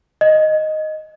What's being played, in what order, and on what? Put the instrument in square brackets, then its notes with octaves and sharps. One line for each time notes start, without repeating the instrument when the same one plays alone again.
[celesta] D#5